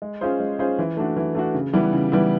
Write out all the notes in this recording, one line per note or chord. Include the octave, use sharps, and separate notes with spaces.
G#3
C#4 F4 G#4 C5
G#3
C#4 F4 G#4 C5
E3
A3 D4 F#4
E3
A3 D4 F#4
C#3
E3 G3 B3 E4
C#3
E3 G3 B3 E4